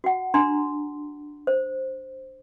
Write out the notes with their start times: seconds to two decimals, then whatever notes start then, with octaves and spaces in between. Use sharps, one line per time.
0.04 F#4 F#5
0.34 D4 A#5 C6
1.47 C5